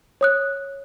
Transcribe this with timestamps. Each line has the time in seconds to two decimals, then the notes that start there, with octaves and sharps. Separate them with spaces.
0.21 C#5 D#6 F#6